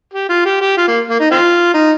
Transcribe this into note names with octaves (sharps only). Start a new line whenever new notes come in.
G4
F4
G4
G4
F4
A#3
A#3
D#4
C4 F4
D#4